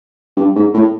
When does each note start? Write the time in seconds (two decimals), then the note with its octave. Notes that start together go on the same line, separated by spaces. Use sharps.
0.37 G2
0.56 G#2
0.74 A2